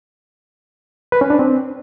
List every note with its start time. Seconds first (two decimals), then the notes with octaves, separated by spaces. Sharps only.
1.12 B4
1.21 C#4
1.30 D4
1.39 C4